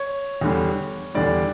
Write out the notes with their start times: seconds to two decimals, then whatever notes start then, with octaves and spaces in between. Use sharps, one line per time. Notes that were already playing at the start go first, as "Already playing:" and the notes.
Already playing: C#5
0.41 E2 D3 G3
1.15 E2 D3 G3 D5